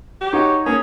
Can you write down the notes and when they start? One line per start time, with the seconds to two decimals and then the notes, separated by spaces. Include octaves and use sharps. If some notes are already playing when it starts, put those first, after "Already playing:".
0.21 G4
0.33 D#4 F#4 C#5
0.66 A#3 C#4 G#4